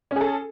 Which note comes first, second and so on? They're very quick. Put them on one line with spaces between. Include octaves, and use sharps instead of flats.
C#4 G#4 A4